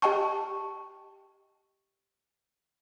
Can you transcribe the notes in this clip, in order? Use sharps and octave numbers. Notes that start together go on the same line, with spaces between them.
G4 D#5 G5 A5 C#6